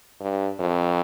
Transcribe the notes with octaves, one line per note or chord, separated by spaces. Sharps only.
G2
F2